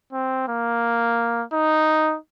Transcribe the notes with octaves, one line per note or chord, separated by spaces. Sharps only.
C4
A#3
D#4